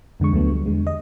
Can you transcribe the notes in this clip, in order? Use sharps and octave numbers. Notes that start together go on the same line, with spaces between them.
F2 D3 G#3 C#6
D2 D3 F#3 A3 B3
G3
E2 D3 G#3
D#5